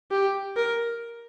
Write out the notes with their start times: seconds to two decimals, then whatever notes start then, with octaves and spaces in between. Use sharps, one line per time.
0.11 G4
0.56 A#4